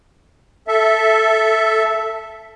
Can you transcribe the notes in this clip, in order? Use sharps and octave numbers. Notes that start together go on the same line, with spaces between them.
A4 E5